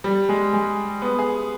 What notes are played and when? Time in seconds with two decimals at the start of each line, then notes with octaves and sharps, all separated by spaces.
0.04 G3
0.29 G#3
0.53 G#3
1.02 B3
1.19 G#4